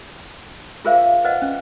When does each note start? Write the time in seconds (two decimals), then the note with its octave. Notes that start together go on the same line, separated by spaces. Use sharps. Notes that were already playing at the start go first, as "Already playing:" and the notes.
0.85 F4 G#4 A#4 C5 E5 F5
1.24 B4 C5 D#5 F#5
1.42 C#4